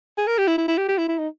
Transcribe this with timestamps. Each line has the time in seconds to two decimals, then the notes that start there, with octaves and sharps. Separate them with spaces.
0.18 G#4
0.27 A#4
0.38 G4
0.48 E4
0.58 E4
0.68 E4
0.78 G4
0.88 G4
0.98 E4
1.08 E4
1.18 D#4